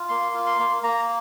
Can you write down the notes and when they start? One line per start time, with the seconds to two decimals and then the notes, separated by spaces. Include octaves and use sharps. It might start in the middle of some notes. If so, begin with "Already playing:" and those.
Already playing: F4
0.09 A#3 C6
0.34 F4
0.46 C6
0.59 A#3
0.83 A#3 A#5